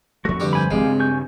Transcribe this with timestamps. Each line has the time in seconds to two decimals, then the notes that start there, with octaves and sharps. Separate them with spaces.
0.25 F2 A3 F#4 C#6
0.40 G2 D3 G4
0.53 C5 G#5 B5
0.71 E1 C#2 G3 G#3 C4 G4 F5 G#5
0.83 G2 C#3
1.00 C#5 G#5 G6